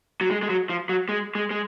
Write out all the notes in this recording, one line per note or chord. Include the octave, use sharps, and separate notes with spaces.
F#3
G#3
G#3
F#3
F3
F#3
G#3
G#3
G#3